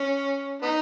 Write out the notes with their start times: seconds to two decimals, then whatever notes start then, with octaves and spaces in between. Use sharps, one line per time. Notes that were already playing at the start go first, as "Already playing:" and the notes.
Already playing: C#4
0.62 B3 D#4